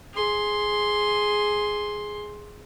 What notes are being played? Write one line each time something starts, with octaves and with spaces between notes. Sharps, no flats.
G#4 C6